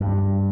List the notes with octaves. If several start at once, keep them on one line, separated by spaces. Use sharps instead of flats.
G2